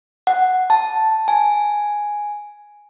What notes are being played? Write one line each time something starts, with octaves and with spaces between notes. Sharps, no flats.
F#5
A5
G#5